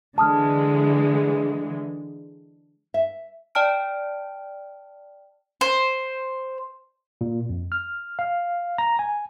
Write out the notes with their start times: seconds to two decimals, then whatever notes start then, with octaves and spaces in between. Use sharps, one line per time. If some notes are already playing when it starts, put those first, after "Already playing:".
0.18 D3 E3 G#3 A5 D#6 F6
2.94 E5
3.55 D5 G5 A5 F6 D7
5.61 C5
7.21 A#2
7.49 F2
7.72 F6
8.19 F5
8.78 A#5
8.99 G#5